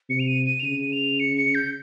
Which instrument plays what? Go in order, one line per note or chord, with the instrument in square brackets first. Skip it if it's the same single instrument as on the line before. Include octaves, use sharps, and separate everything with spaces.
[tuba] C3 [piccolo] C#7
[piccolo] F7
D#7
D#7
F7
[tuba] C#3 [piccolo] D#7
[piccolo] F7
C#7
C#7
G6